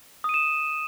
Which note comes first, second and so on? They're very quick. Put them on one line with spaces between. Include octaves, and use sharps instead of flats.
D#6 D#7 E7